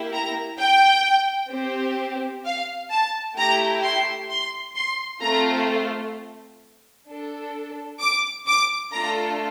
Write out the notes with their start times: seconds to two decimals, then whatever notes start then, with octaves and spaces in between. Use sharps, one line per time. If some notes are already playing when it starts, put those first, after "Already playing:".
Already playing: A#3 E4 G4
0.12 A#5
0.59 G5
1.51 C4 G4
2.45 F5
2.90 A5
3.36 A3 E4 G4 A#5
3.83 C6
4.29 C6
4.76 C6
5.21 A3 C4 F4 A#5
7.07 D4 A4
8.00 D6
8.46 D6
8.92 A3 D4 F4 A4 A#5